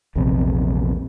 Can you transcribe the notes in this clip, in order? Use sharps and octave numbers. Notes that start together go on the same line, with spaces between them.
A#1 E2 C3